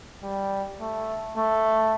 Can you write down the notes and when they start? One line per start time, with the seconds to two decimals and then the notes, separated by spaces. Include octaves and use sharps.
0.23 G3
0.80 A3
1.37 A3